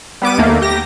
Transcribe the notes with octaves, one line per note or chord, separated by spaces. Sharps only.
G3 B3 D6 D#7
D#2 A3 A#3
G4 A#6